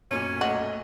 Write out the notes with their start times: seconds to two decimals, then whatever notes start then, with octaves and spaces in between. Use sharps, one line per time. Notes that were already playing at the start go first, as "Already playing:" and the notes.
0.11 B1 F#2 A#2 C#4
0.41 A3 F#4 D#5